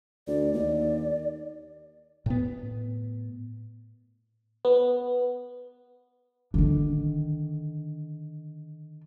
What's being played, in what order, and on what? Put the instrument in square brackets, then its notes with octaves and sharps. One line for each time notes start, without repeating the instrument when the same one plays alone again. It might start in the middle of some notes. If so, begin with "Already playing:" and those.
[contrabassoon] D2 [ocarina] D5
[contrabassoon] D#2 [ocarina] D5
[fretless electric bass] A2 B3
[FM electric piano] B3
[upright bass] D3 D#3